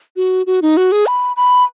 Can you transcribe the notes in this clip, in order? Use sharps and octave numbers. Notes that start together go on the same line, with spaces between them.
F#4
F#4
D#4
F#4
G#4
B5
B5